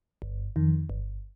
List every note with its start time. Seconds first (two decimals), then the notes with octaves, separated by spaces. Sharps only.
0.22 G1
0.56 F2 D#3
0.90 G1